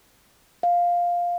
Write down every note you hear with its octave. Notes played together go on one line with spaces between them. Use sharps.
F5